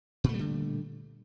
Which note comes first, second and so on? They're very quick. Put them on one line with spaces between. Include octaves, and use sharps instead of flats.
A#2 A3 G3 D3